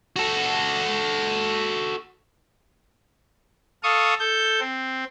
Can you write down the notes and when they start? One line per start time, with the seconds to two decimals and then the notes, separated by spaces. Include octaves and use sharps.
0.16 F#4 A4
3.83 A4 F5 C#6 D#6
4.19 A4 G6
4.60 C4